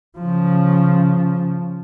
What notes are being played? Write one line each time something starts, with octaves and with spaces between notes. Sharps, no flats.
C#3 F3